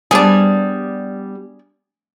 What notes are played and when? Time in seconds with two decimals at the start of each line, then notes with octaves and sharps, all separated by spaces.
0.11 G3 B3 D4 G#4